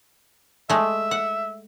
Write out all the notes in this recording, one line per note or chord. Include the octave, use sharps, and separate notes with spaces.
G#3 A3 E5
F#5